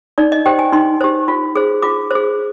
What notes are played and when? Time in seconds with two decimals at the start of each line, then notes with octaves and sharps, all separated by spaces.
0.18 D#4 D5
0.32 D#5
0.46 G4 C5 G5
0.59 G#5
0.72 D#4 C6
1.01 G4 C5
1.28 F4
1.55 G#4 C5
1.82 F4 D6
2.11 G#4 C5